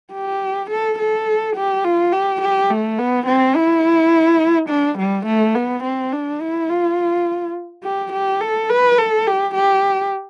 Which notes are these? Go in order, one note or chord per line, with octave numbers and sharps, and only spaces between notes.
G4
A4
A4
G4
F4
G4
G4
A3
B3
C4
E4
D4
G3
A3
B3
C4
D4
E4
F4
G4
G4
A4
B4
A4
G4
G4